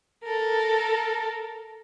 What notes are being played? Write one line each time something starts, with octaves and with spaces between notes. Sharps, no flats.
A4 A#4